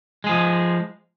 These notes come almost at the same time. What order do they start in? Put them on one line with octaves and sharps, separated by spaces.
G#3 G#4 F3